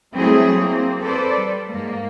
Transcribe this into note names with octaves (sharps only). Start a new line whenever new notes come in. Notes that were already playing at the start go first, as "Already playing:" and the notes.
F#3 G3 A3 C4 E4 G#4
A#3 C4
A4 B4 C5 D5
G3
G#2 A#3